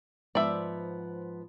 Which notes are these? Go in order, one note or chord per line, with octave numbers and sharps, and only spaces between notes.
G#2 F3 B3 D5 E5